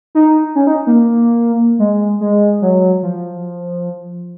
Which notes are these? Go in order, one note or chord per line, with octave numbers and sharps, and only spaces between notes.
D#4
C#4
D#4
A#3
G#3
G#3
F#3
F3